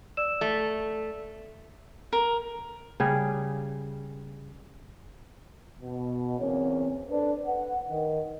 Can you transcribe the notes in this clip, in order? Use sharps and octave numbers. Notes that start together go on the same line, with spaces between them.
D5 E6 E7
A3
A#4
C#3 G3 G#4
B2
E2 C#3 A#3 C4 C#4 C#5
D4 A4 B4 C5 D5
B4 F#5
D#3